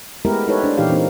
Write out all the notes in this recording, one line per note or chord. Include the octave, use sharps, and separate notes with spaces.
G#3 A3 B3 E4 G4 A#4
D#4 E4 G4 A4 B4 C#5
D4 C5
A#2 E3 D#4 G4 F5
E3 A#3 C4 D#4